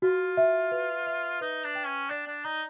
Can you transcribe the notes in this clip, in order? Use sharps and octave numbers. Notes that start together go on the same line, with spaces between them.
F4 F#4
E5
B4
E5
D#4 B4
D4
G5
C#4
D4 D5
D4
D#4 A#5